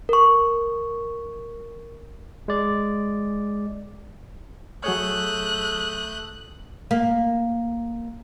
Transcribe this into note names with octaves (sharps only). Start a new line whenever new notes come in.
A#4 C#6
G#3 D5
F#3 A3 G#4 C#5 D#6 F#6 G6
A#3